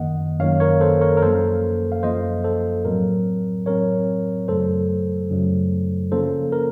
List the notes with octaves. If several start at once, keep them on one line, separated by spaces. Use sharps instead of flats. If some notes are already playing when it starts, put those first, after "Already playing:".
Already playing: F#2 D#3 A#3 D#5 F#5
F#2 D#3 A#3 C#5 F5
A#4 C#5
A4 C5
A#4 C#5
A#4
F#2 F3 A#3 A4 C5
F5
F#2 F3 A#3 C5 D#5
A4 C5
A2 F#3 C4 A#4
A2 F#3 C4 A#4 C#5
F#2 C#3 F#3 A3 A4 C5
F#2 C#3 F#3 A3
C#3 F3 A#3 C#4 A4 C5
A#4